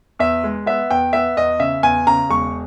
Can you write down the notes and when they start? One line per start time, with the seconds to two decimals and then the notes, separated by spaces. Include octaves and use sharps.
0.19 E2 E5
0.44 G#3
0.66 B3 E5
0.91 E2 G5
1.13 B3 E5
1.37 E2 D#5
1.59 C#3 E5
1.83 E2 G#5
2.07 C#3 A#5
2.29 E1 C#6